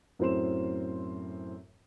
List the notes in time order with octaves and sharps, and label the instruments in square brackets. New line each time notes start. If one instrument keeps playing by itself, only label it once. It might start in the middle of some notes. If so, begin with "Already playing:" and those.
[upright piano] F#2 A2 C4 C6 E7